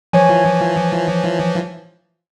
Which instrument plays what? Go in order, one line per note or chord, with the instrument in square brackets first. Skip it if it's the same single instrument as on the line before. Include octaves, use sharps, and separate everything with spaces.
[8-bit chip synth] E3 F3 [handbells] C#5 G#5